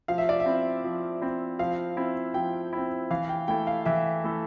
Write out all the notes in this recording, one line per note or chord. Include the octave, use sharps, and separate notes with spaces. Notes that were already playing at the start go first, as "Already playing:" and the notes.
F3 F5
E5
D5
E5
C4 E4
F3
C4 E4
F3 F5
C4 E4
F3 G5
C4 E4
E3 F5
G5
A3 E4 A4 G5
F5
E3 E5
A3 E4 A4